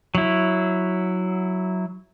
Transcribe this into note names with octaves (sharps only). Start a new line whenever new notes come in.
F#3 E4